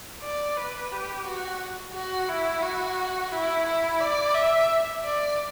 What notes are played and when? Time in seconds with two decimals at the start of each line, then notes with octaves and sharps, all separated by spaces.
0.22 D5
0.57 B4
0.91 G4
1.25 F#4
1.94 F#4
2.29 E4
2.63 F#4
3.32 E4
3.66 E4
4.00 D5
4.34 E5
5.03 D5